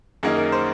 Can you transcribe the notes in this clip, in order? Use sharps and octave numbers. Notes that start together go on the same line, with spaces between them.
F#2 D#3 A#3 D#4 G#4
A#4
C5